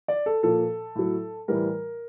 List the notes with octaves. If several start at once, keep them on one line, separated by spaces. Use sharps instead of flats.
D5
A4
A#2 F3 A4
A2 F#3
A2 E3 G3 A#4